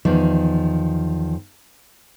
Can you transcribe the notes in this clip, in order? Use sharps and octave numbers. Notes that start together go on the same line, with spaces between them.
E2 D#3 F3